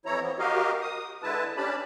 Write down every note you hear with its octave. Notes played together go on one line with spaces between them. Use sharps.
F2 E3 E4 C#5 A#5
E3 F3 B3 C4
F#4 G4 A#4 D#5 F5
D#6
D3 G#3 E4 B4 A5
C#4 D4 G4 A5 B5